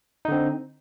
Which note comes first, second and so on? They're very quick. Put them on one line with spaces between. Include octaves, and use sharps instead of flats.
D#4 D3 C4